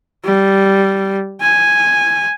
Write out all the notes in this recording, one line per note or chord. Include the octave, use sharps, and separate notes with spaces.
G3
G#5